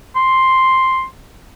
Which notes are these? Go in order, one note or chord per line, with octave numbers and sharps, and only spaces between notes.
C6